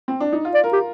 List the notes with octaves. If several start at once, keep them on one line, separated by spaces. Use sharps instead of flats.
C4
D4
D#4
F4
D5
A#4
G4